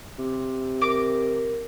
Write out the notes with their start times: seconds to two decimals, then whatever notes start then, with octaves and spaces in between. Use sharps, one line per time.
0.19 C3
0.82 A#4 D6